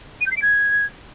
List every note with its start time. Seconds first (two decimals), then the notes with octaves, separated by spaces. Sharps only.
0.21 D#7
0.26 G6
0.31 C7
0.36 D7
0.42 G#6